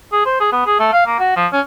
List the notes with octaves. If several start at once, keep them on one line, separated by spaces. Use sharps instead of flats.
G#4
C5
G#4
B3
G#4
A3
F5
A#3
F#4
F3
C#4